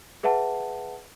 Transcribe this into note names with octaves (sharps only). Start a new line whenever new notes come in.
G#4 B4 E5 F#5 A5